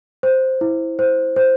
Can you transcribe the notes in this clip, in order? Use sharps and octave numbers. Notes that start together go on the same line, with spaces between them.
C5
E4
C5
C5